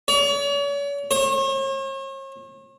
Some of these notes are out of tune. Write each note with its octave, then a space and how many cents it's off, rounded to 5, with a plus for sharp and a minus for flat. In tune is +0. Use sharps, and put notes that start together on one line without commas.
C#5 +40
C#5 -45